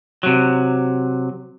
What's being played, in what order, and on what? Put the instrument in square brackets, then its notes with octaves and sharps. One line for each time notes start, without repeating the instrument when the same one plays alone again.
[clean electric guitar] C3 F#3